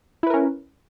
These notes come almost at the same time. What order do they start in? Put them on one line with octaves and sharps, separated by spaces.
E4 B4 A#4 C#4